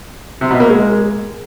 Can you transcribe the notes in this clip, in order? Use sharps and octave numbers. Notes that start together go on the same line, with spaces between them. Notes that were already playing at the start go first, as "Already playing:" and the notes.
C3
B2
A#3
G#3